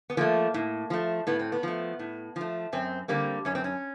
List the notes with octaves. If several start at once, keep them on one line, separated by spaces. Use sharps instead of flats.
B3
F3 A3 A#3
A2
F3 A3
A2 B3
C4
B3
F3 A3
A2
F3 A3
F#2 C4
D3 G3 A#3 C4
F#2 C#4
C4
C#4